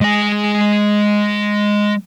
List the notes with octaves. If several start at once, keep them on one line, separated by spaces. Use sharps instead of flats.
G#3 G#5